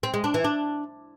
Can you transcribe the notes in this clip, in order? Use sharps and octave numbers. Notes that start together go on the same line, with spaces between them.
C4
G#3
D4
E3
D4